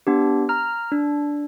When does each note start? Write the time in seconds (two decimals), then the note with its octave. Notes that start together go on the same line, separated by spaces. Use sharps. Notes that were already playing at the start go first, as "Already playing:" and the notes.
0.07 B3 D4 G4
0.49 A#5 F6
0.92 D4